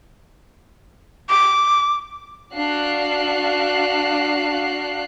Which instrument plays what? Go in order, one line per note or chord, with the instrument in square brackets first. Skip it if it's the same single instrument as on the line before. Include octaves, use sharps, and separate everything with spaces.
[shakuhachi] D6
[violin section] D4 F#4 F5 F#6 C7